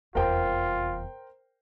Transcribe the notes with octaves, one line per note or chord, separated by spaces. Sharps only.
F1 E2 F4 A#4 C5 G5